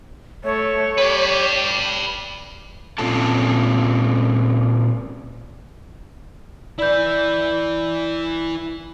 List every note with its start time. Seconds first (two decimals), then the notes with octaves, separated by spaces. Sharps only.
0.44 A3 C#5
0.98 G4 B4 D5
2.98 A#2 C4 C#4 F4 A4 A5
6.78 E4 B4 D5 B5 G6